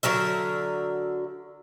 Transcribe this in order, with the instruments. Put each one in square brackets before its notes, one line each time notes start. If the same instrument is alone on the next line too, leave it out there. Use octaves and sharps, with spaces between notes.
[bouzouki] D3 F#3 A#4 E5